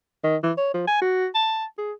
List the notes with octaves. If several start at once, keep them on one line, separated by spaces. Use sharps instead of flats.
D#3
E3
C#5
F3
G#5
F#4
A5
G#4